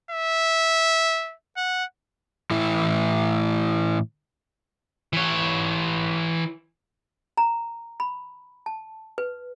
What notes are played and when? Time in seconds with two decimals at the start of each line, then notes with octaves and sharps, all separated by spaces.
0.11 E5
1.57 F#5
2.51 A2 E3 E4
5.13 E3 C#5
7.37 A#5
8.00 B5
8.66 A5
9.18 B4